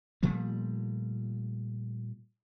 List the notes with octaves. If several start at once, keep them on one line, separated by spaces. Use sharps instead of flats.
A#2 F3 G3 A3